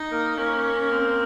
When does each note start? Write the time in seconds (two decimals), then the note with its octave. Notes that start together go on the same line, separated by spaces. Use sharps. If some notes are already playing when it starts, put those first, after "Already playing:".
Already playing: D#4
0.11 A#3 A#4
0.38 A#3 C#4 A#4
0.92 C4